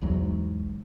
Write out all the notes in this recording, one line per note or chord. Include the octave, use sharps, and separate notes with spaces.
B1 E2 G#2 F#3